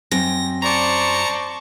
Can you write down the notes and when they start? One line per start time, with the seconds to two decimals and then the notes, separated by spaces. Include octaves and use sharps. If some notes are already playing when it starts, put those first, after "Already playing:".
0.12 F#2 C4 G5 A#6
0.62 C5 D5 A5 A#5 C#6 C#7